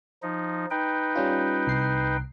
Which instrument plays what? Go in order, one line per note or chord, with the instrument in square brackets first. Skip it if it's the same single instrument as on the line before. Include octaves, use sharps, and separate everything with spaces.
[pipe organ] F3 D#4
D#4 B4 G5
[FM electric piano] G3 C#4 F4
C2 C7